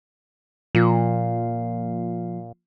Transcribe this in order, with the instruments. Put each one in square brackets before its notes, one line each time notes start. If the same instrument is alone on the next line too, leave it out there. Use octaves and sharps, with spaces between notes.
[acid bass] A#2 [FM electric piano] F3 A#3 F4